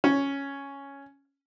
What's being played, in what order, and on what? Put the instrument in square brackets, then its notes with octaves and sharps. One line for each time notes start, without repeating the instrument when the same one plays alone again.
[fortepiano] C#4